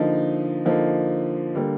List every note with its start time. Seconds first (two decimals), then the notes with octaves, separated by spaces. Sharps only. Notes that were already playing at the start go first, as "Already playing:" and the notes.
Already playing: D3 F3 A#3 D#4
0.65 D3 F3 A#3 D#4
1.55 D3 G3 A#3